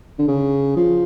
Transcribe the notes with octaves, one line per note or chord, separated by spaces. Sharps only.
D3
C#3
F3